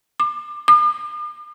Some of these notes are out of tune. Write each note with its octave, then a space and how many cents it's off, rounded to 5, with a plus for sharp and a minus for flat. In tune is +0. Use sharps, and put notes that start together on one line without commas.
D6 +35
D6 +45